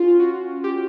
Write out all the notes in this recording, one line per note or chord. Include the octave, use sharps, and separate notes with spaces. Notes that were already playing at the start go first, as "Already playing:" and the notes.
Already playing: C#4 F4
F#4
G4